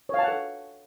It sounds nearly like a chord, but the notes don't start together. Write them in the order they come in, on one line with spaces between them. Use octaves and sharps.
C#5 F5 A5 F#5 A4